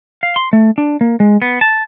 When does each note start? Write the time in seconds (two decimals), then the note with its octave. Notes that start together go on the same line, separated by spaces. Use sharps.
0.23 F5
0.36 C6
0.53 A3
0.78 D4
1.01 A#3
1.20 G#3
1.42 B3
1.61 A5